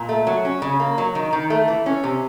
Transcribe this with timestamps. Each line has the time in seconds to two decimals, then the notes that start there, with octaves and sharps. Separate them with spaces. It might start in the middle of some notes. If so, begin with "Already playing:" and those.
Already playing: A#2
0.09 A3
0.27 F#3
0.45 C#4
0.62 C#3
0.80 A#3
0.98 F#3
1.15 D#3
1.33 D#3
1.50 A3
1.68 E3
1.86 C#4
2.04 C3